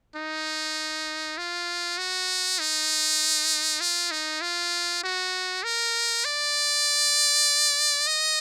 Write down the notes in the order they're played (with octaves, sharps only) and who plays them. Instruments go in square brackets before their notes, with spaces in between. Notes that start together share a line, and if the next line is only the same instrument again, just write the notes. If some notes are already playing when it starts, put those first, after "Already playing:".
[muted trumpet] D#4
F4
F#4
D#4
F4
D#4
F4
F#4
A#4
D5
D#5